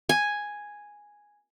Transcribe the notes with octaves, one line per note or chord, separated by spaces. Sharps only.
G#5